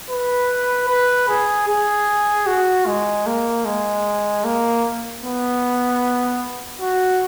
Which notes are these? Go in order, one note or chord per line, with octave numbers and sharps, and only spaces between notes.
B4
B4
G#4
G#4
F#4
G#3
A#3
G#3
A#3
B3
F#4